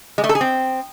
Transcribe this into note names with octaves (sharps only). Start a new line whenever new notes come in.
G#3
A3
A4
G#4
C4